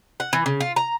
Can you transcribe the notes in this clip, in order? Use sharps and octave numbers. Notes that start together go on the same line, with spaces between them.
F#5
E3
C#3
F4
A#5